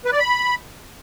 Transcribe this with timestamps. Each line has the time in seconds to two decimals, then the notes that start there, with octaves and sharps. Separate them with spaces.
0.05 B4
0.12 D5
0.19 B5